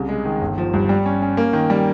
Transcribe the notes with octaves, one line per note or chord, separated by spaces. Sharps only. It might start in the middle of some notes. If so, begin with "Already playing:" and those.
Already playing: C2 C#3
G#3
D#3
G1
F3
G2
G3
C#4
C#4
A#3
D#3
G3